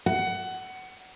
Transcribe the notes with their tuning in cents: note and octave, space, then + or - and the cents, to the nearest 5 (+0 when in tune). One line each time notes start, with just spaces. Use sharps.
F#5 +20